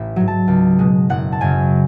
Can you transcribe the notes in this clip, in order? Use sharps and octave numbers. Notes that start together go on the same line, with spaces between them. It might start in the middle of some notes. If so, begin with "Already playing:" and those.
Already playing: A1 B5
G#2 F#3
A5
C#2
B2 G#3
F#1 F#5
A5
F#2 C#3 G#5